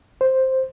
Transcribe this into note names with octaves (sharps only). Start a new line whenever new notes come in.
C5